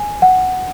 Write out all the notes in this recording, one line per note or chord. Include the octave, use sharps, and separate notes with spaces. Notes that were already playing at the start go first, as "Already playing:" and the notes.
Already playing: G#5
F#5